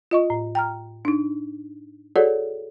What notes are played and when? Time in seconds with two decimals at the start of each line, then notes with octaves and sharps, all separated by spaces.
0.11 F4 D#5 C#6
0.30 A2
0.55 G5 A#5 F6
1.05 D4 D#4
2.16 F#4 G#4 A4 C#5 D5 F#5